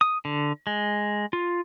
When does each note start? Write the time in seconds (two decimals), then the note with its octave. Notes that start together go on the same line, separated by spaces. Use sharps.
0.01 D#6
0.25 D3
0.67 G#3
1.33 F4